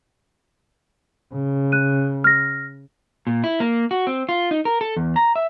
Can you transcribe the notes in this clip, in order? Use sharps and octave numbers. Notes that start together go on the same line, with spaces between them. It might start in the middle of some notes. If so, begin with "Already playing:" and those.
C#3
F#6 D#7
F6 A#6
A#2
E4
A#3
F#4
C4
F4
D#4
A#4
A4
E2
A#5
E5